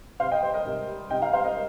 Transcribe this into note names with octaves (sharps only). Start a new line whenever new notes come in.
C3 C5 F5
D#5 G5
G3 C5
A#4 D#5
C3
G3
C3 D#5 G5
F5 A#5
G3 C5 F5
A#4 D#5